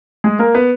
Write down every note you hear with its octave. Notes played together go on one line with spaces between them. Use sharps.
G#3 G#4
A#3 A#4
B3 B4